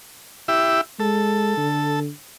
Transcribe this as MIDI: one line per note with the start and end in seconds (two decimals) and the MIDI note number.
0.48 0.81 64
0.48 0.81 67
0.48 0.81 76
1.00 1.53 56
1.00 2.00 69
1.57 2.09 50